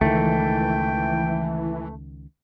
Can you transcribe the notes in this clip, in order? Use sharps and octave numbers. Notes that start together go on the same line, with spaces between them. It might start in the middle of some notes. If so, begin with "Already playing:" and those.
C#2 D#3 E3 A3 G5